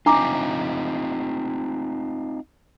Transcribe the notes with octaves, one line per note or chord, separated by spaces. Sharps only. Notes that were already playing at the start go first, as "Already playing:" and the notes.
C4 D4 D#4 F4 A#5 D6